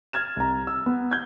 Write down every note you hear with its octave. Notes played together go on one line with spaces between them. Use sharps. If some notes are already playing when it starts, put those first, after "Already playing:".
F6 G#6 A6 E7
C2 A#5
E6
B3
G6 G#6